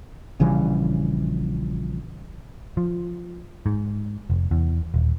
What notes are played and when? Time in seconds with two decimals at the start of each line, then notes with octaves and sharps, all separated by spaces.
0.40 A#1 C#3 E3 G3
2.77 F3
3.66 G#2
4.30 F1
4.51 E2
4.94 D#1